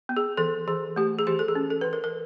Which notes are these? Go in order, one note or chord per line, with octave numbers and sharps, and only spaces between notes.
B3
G#4
E3 A4
E3 G#4
A3 G4
G#4
E3 G4
A4
G#4
C#4
A4
E3 B4
A#4
A#4